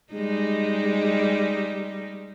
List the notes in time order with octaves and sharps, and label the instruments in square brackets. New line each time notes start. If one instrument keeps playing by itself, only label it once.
[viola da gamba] G3 G#3 D#4